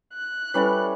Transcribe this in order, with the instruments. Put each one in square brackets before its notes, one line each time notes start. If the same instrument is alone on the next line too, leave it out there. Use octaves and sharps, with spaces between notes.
[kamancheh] F#6
[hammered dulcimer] G3 C#4 E4 [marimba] A4 B4